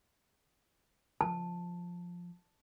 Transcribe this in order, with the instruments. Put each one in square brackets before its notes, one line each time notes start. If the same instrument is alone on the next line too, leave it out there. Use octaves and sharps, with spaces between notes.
[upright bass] F3 [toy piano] A5